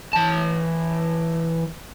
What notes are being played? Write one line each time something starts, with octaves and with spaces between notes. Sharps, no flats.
E3 A5